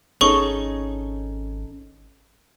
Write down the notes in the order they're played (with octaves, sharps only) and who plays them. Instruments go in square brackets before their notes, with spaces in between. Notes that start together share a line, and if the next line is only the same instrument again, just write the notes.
[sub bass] G#1 [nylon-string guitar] C#4 D#4 A4 [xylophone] G#4 C#6 G7